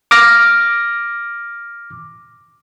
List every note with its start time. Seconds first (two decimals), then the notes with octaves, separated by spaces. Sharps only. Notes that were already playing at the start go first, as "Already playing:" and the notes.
0.11 D6 F6 A#6